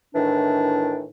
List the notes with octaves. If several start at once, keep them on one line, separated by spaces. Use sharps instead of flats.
A2 D#3 E3 D4